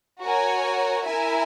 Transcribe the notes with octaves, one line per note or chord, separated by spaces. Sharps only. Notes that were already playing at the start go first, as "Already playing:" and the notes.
F#4 A#4 C#5 G#5
E4 A#4 E5 G#5